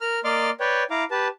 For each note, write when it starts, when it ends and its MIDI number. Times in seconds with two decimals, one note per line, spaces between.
0.01 0.19 70
0.01 0.19 82
0.01 0.19 89
0.24 0.50 58
0.24 0.50 74
0.24 0.50 75
0.24 0.50 84
0.24 0.50 86
0.24 0.50 89
0.60 0.83 71
0.60 0.83 73
0.60 0.83 74
0.60 0.83 79
0.91 1.04 64
0.91 1.04 77
0.91 1.04 82
0.91 1.04 86
1.11 1.28 67
1.11 1.28 71
1.11 1.28 81